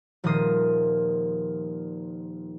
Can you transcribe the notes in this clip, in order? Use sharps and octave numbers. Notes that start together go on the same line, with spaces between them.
D#1 F3 A#4 D#6 C7